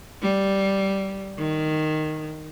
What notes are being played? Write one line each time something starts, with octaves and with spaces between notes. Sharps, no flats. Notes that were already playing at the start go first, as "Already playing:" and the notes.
G3
D#3